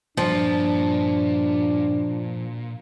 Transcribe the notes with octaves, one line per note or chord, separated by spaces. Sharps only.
G2 A#2 F3 D4